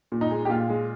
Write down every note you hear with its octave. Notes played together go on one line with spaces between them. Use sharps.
A#2
D#4
G#3
G4
A#2 F4
G#3